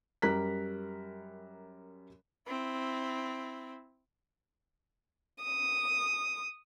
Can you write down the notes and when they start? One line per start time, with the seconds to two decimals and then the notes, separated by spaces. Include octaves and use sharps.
0.22 F#2 G3 A#4 A#5 F#6 B6
2.47 C4 E4
5.44 D#6